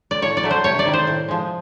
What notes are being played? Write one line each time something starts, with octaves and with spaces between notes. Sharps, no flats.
D5
A2 C#5
D5
F#3 A3
C5
C3 C#5
D5
D#3 G3
C5
A2
F3 G#3